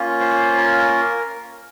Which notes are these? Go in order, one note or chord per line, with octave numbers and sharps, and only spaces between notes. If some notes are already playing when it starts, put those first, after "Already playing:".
Already playing: A#3 C#4 F4
C5
A#4